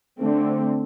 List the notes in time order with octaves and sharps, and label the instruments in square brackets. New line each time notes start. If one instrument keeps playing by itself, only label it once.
[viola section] D3 A3 C4